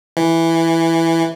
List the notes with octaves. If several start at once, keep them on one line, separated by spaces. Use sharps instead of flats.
E3